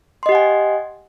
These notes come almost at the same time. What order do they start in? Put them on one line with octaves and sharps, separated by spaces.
C6 D#5 G4 F#5 G#5